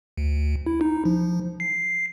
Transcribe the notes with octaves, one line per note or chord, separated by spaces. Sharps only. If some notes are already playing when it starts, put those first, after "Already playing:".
D2
E4
D#4
F3
C7